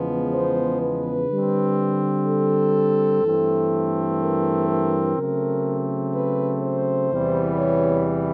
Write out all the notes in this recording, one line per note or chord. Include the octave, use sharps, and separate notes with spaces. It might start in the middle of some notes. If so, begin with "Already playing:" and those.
Already playing: E2 C#3 F3 G#3 B3
C5
B4
D3 G3 C4
A4
G2 E3 A3 C4
A#4
A#4
C#3 F#3 A3 C4
B4
C5
E2 C3 E3 G3 B3
C#5